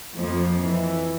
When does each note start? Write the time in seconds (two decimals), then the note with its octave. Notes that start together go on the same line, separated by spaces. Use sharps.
0.17 F2 F3 A#3
0.61 E3